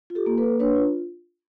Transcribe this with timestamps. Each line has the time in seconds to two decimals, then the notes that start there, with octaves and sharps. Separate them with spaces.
0.10 F4
0.15 G4 A4
0.26 A#3
0.38 A4 B4
0.43 A#3
0.60 D4 B4 C#5
0.76 F4